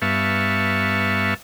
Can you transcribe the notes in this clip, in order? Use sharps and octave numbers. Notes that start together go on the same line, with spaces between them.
G2 B3 E5 F5 A5 C#6